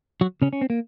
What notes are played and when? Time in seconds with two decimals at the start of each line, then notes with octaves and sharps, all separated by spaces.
0.21 F#3 F#4
0.42 C#3 C#4
0.53 C#4
0.61 C4
0.70 A#3